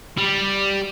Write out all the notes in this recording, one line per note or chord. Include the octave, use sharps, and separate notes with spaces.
G3